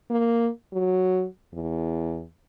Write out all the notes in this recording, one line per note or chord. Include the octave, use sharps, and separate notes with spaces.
A#3
F#3
E2